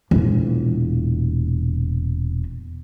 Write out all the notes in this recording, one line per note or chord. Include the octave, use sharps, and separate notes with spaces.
E1 A#2